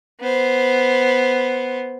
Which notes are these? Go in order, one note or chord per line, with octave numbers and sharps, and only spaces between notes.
B3 C5